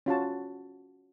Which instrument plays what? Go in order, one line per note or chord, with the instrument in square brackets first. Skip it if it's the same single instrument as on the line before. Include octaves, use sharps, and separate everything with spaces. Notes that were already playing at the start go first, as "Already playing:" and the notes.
[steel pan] C#4 F4 F#4 A5